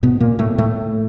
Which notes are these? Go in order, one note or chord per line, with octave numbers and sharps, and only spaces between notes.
G#2 B2 B3
A#2 A#3
A2 A3
A2 A3